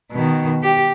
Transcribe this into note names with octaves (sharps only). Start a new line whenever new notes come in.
B2 D#3
G4